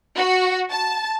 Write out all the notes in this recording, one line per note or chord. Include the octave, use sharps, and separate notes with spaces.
F#4
A5